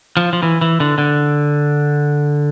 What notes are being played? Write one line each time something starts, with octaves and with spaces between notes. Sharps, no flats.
F3
F3
E3
E3
D3
D3